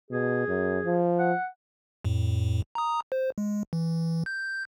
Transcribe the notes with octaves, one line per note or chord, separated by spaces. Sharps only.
B2 G#4
F#2
F3
F#5
F2 A2
A#5 D#6
C5
G#3
E3
G6